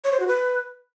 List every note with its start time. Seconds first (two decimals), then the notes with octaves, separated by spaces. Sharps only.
0.04 C#5
0.12 C5
0.20 F#4
0.28 B4